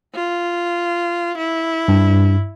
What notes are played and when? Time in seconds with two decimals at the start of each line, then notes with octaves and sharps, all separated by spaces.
0.14 F4
1.38 E4
1.88 G2